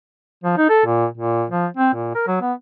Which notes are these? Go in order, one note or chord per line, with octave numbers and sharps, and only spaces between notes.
F3
D#4
A4
A#2
A#2
F3
C4
A#2
A#4
F#3
B3